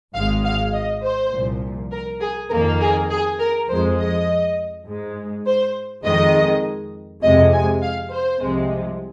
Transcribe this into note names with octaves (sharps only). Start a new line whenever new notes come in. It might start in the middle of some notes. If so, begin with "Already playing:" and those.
G#1 G#2 G#3 F5
F5
D#5
C5
C2 A#2 F3
A#4
G#4
F2 D#3 A#3 A#4
G#4
G#4
A#4
F2 F3 G#3 C5
D#5
G#2 G#3
C5
F2 D#3 G#3 D#5
F2 C3 G#3 D#5
G#5
F5
C5
C2 C3 F3 G#3